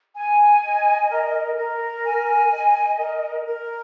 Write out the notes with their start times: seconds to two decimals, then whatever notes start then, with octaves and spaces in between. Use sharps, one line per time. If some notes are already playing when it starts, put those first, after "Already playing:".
0.16 G#5
0.63 D#5
1.10 A#4
1.57 A#4
2.04 G#5
2.50 D#5
2.98 A#4
3.45 A#4